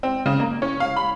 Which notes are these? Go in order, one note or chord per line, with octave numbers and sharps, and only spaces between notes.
C4
C#3
A#3
C#4
F5
B5